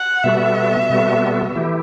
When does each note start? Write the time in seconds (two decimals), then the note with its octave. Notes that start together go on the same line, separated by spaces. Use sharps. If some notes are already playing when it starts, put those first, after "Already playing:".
Already playing: F#5
0.24 B2 G3 B3 F#4 A4 E5
0.90 B2 G3 B3 F#4 A4
1.56 E3 A3 E4 G4